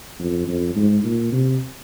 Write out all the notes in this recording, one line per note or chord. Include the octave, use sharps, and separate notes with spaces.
F2
F2
G#2
A#2
C3